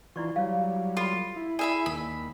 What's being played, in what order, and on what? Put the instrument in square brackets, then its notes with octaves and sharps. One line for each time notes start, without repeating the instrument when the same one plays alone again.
[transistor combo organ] E3 F4 [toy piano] E4 D5 C#6
[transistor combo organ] F#3 G3 [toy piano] C#5 F5
[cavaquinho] F4 [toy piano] A4 B5
[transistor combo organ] E4
[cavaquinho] G#4 E5 B5 [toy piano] D5
[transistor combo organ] D#2 [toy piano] A#4 D#6 [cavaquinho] B5